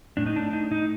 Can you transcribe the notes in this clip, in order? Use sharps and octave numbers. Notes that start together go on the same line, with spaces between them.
A2 D4
D#4
D4
D#4
D#4